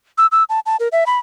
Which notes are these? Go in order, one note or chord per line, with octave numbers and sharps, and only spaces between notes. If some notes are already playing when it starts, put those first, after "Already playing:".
E6
E6
A5
A5
A#4
E5
B5